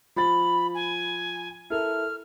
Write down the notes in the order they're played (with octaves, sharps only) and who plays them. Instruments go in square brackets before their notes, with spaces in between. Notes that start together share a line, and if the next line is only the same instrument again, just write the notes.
[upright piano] F3 A6 [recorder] B5
[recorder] G#5
[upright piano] E4 A4 A#4 [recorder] F6